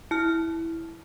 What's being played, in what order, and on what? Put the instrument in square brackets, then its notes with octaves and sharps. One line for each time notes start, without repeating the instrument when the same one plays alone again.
[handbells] E4 F6